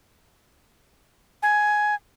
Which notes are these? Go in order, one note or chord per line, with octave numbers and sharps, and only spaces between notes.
G#5